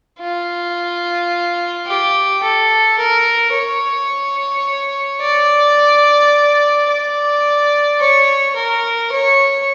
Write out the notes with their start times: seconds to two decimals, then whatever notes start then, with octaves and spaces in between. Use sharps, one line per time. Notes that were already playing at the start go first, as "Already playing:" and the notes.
0.20 F4
1.86 G4
2.42 A4
2.98 A#4
3.54 C#5
5.21 D5
6.89 D5
8.00 C#5
8.55 A#4
9.12 C#5